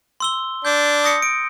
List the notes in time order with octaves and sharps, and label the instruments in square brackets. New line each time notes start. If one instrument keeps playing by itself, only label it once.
[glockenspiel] C6 E6 G7
[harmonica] D4 [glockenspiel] G6
[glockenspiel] D#6 A#6 C#7
D7